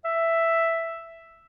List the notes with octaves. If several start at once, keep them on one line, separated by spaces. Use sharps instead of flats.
E5